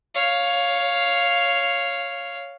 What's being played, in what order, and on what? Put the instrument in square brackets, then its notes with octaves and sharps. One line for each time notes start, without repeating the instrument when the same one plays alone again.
[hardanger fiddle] C#5 F5